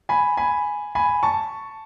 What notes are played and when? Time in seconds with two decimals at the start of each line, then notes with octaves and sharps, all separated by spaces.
0.09 G#5 B5
0.37 G#5 B5
0.95 G#5 B5
1.23 A5 C#6